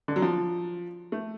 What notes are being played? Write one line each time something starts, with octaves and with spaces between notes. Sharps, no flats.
D3
F#3
F3
A3